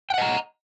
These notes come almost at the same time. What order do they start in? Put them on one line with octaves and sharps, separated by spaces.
G5 F#5 D#5 A#5